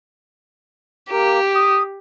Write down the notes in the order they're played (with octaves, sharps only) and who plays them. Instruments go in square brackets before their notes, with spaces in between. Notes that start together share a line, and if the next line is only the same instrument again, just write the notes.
[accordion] A#3 [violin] G4
[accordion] D#6